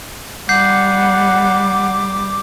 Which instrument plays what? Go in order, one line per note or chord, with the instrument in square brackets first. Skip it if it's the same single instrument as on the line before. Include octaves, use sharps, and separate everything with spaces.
[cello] G3 [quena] F#5 [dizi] D6 [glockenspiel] G6 C7